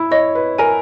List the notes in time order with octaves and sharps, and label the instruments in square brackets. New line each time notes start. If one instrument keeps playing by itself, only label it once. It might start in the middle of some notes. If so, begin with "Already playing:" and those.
Already playing: [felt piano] E4
[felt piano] C#5 [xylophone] D#5
[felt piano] B4
[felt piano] A#4 [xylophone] G#5